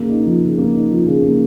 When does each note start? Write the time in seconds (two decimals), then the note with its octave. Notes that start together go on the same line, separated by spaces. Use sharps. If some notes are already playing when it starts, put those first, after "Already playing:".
Already playing: C#3 A#3
0.09 D#4
0.25 F3
0.42 C#3
0.58 A#3
0.74 D#4
0.90 F3
1.06 C#3
1.22 A#3